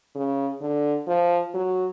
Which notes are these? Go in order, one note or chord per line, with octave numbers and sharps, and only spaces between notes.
C#3
D3
F3
F#3